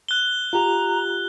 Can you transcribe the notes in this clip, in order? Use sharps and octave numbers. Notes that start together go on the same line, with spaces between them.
F#6 G7
F4 G4 A#5